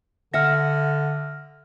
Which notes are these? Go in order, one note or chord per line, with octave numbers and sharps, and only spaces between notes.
D3 E5 F#5 F6 A#6